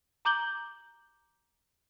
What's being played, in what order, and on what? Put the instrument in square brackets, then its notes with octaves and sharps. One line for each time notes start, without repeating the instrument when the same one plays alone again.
[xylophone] A#5 D6 G6 F#7 G7